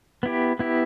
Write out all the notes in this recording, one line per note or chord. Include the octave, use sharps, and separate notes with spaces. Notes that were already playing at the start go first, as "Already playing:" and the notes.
B3 E4 G4
B3 E4 G4